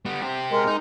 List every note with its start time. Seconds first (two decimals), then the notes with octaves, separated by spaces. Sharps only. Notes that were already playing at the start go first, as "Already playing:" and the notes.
0.05 G3 B3
0.22 C4 G4
0.51 G#3 A#4
0.67 D#4